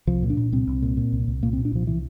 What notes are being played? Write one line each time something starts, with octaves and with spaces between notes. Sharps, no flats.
C2 F3
A#2
D4
A#2
C2 C4
C2
A#2
A#2
C2
C2
A#2 A#3
C4
A#2
D4
C2 F3
E3